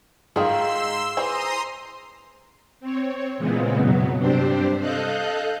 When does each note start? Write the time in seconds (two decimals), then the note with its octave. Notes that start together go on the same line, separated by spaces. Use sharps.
0.36 G#2 D#3 F4 G#4 F5 C6 E6
1.17 E3 C5 A#5 C6 D#6
2.80 C4 C#5
3.37 A#2 C#3 E3 G#3 B3 C4
3.78 F#2 B2 F#3 B3
4.17 G2 C3 C4 D4 G4 C5
4.79 A4 D#5 F5 F#6 G6